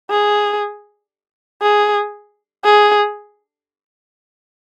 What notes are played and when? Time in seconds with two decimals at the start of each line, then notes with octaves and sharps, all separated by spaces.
0.10 G#4
1.62 G#4
2.64 G#4